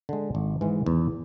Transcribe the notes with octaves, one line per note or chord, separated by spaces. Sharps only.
D3 G#3
G#1
G#2 E3 G#3
E2